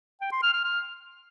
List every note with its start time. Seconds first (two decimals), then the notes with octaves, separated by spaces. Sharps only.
0.21 G5
0.32 C6
0.43 F6
0.53 F6
0.64 F6